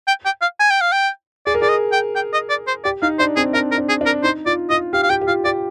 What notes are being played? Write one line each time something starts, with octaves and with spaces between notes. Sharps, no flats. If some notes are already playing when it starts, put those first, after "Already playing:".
G5
G5
F5
G#5
G5
F5
G5
G#4 D5
A#4
G#4 D5
D#5
G5
G5
D#5
D5
C5
G4 D5
D#4 F5
D4 C5
C4 G#4
D4 A#4
A#4
D4
G#4
D4
A#4
D#4 C5
F4 D5
F4 D#5
G4 F5
F5
G4 G5
G4
F4 F5
G4 D5